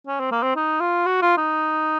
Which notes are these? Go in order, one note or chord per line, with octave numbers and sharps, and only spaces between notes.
C#4
C4
A#3
C4
D#4
F4
F#4
F4
D#4